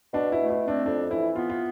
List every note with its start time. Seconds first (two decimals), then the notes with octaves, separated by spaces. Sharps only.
0.14 B2 D4
0.32 E4
0.38 A3
0.50 E4
0.62 C4
0.68 D4
0.86 F2 D4
1.10 E3 E4
1.35 B3 F4
1.50 F4